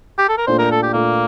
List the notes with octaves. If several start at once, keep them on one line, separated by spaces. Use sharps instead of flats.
G4
A4
A#4
A#2 A3 D4 C5
A#4
A4
G4
A#2 A3 A#3 D4